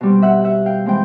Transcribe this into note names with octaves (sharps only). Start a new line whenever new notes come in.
B2 G3 C4
E5 F#5
E5 F#5
F5 G5
E3 G#3 C4 G5